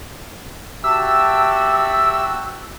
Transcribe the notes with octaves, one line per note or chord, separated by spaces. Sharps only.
F#4 G4 E5 G5 A5 E6